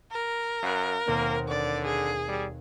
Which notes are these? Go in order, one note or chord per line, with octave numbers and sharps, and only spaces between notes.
A#4
F#2 F5 B5 F#6
D#2 B2 A#3 C4
D3 D5
G#4 D#7
G3